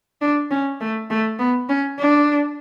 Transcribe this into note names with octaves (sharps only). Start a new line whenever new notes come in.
D4
C#4
A3
A3
B3
C#4
D4